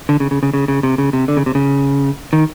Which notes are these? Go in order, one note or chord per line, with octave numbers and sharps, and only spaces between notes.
D3
C#3
C#3
C#3
C#3
C#3
C3
C#3
C3
D3
C#3
C3
C#3
D#3